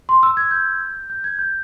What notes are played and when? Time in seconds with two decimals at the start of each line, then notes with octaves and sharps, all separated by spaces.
0.09 C6
0.23 E6
0.37 G#6
0.51 G6
1.10 G6
1.24 G#6
1.39 G6